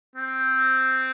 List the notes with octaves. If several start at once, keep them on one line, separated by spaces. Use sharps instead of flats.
C4